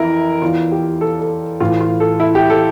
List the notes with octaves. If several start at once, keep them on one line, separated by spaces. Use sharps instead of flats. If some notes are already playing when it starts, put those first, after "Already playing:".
Already playing: F2 E3 E4 A#4
E2 E3 F4
G4
A4
A4
A2 E3 F4
F4
A4
E4
G4
A4